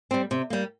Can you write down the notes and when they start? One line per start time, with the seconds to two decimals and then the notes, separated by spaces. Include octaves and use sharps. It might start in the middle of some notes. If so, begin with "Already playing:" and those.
0.11 G3 C4
0.31 C3
0.50 G3 A#3